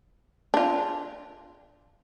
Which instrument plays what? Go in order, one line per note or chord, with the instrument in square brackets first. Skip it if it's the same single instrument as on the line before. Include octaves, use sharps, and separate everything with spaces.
[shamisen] D4 F4